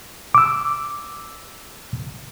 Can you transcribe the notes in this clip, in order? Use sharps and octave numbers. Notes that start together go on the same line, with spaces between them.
D6 E6